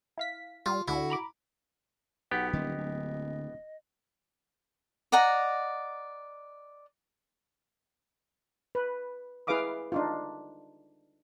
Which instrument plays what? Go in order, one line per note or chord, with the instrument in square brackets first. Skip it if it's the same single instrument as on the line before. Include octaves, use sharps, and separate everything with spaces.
[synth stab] E4 F5 B6
[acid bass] G3 [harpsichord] F4
[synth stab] D2 [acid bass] D3 [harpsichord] E4 [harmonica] F#4
[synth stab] A#5 B5 D6
[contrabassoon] B1 [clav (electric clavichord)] B3 G4 [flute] F#5
[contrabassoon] D#1 [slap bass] D3 F#3 A#3 [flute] D#5
[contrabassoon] D1
[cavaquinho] D5 D#5 F#5 A#5
[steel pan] B4
E4 G#4 B4 F5 D6 D#6
D4 D#4 F4